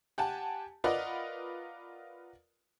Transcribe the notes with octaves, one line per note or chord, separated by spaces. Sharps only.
G4 F#5 G#5 A5
F4 A#4 B4 D5 D#5 F#5